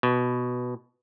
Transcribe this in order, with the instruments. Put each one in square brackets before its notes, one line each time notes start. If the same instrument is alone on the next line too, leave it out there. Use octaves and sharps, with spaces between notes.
[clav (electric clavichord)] B2